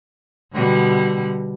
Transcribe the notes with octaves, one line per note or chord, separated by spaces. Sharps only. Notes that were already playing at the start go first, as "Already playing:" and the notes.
B2 D3 G3